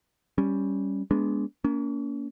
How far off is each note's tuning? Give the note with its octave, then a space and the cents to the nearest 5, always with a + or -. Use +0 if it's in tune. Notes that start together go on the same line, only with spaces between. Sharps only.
G3 +0 C#4 +0
G#3 +0 B3 -15 D4 -25
A#3 +0 C#4 +40